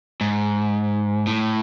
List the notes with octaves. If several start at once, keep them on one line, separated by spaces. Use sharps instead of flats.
G#2
A2